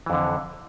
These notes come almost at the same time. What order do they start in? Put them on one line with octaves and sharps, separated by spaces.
E3 F2 D3